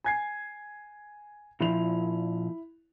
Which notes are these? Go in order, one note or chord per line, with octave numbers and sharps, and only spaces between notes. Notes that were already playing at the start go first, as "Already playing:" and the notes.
G#5 G#6 C7
A#2 F3 E4 F7